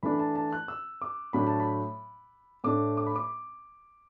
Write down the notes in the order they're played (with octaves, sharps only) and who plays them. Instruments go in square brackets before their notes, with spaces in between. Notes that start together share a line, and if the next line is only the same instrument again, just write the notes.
[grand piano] E3 A3 D4 B5
A5
A5
F#6
E6
D6
A2 F#3 D4 B5
A5
B5
A2 A3 D4 D6
D6
B5
D6